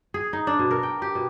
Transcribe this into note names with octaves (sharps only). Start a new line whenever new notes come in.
G#4
D#4
D4
B2
A#4
G5
G4
B2